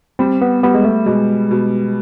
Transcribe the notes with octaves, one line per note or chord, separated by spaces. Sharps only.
G3 C4
B3
G3 B3
G#3
A3
B2 G#3
B2